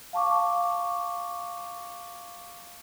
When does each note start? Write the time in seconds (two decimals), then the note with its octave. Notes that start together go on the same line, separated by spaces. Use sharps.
0.13 F5 A5 C#6 D6